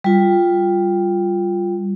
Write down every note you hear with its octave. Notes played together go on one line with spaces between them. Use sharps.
G3 F4